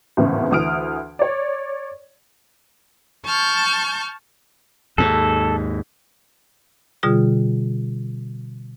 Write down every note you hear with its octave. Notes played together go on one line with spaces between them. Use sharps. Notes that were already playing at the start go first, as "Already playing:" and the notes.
G#1 E2 A2 C#3 E3
D2 E3 D#6 F6 D7
C#5 D5
A5 C#6 F6 G6
D#2 G#2 A4
B2 D3 G3 F4 G#4